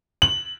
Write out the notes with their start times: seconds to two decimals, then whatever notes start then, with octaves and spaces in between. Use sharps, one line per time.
0.22 F#7